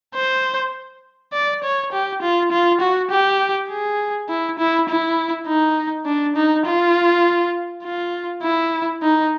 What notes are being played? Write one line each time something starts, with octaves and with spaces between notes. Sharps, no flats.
C5
D5
C#5
G4
F4
F4
F#4
G4
G#4
E4
E4
E4
D#4
D4
D#4
F4
F4
E4
D#4